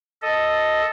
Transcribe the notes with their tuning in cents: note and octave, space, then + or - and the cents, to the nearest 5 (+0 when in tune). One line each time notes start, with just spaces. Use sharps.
A4 +0 D#5 +0